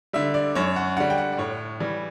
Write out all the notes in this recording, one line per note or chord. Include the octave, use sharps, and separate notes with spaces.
D3 G3 E5
D5
F#2 C#5
F#5
D3 G3 F#5
G5
F#5
D5
A2 C#5
E3 G3